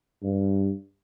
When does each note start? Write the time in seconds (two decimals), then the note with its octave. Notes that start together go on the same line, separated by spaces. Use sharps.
0.22 G2